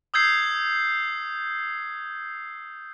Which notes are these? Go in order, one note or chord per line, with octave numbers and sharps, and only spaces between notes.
D#6 E6 G6 G#6 C7